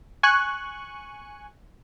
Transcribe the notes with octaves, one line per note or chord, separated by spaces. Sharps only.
G#5 C#6 F#6